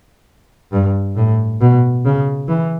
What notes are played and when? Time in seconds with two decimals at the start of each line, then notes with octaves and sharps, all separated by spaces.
0.72 G2
1.16 A2
1.61 B2
2.05 C#3
2.48 E3